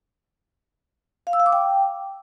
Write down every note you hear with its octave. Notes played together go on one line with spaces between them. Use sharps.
F5
E6
F5
D6
G5